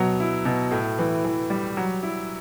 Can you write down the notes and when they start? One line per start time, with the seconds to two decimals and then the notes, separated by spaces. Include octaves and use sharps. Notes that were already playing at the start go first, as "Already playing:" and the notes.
Already playing: B2 F#3
0.20 E4
0.45 B2
0.72 A2
0.99 E3
1.25 E3
1.50 G3
1.77 F#3
2.03 E4